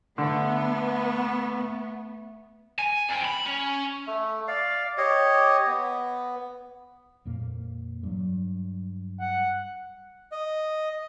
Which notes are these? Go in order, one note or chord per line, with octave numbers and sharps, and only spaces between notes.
D3 A3 B3
G#5
F2 G5
B5
C#4
A3
D5 F5
G4 C#5 D#5
B3
F2 A#2 A#3
G2 F#3
F#5
D#5